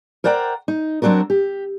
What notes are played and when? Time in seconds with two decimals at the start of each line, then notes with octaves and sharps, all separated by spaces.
0.24 A#4 C5 D5 F#5 G5 A#5
0.68 D#4
1.02 F#3 C4 D4 F#4 A#4
1.30 G4